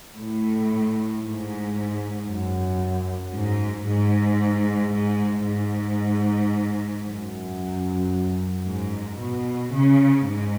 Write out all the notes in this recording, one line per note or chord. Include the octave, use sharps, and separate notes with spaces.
A2
G#2
F#2
G#2
G#2
G#2
G#2
F#2
G#2
B2
C#3
G#2